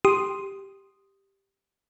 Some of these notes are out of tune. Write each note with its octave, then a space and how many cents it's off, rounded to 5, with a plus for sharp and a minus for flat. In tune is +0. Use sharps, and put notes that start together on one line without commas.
G4 +0 C6 +0 D#6 -5